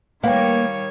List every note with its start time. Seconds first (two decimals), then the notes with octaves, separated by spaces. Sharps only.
0.23 D#3 G3 A#3 B4 C#5 F5 G5